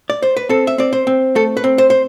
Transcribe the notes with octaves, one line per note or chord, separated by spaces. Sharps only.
D5
C5
B4
C4 A4
E5
C4 D5
C5
C4
A3 A4
B4
C4
C5
C5